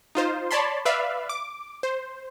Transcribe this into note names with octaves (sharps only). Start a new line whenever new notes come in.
D#4 F4 C5
C#5 D5 A5 B5 C6
B4 D5 E5 F5 B5
D6
C5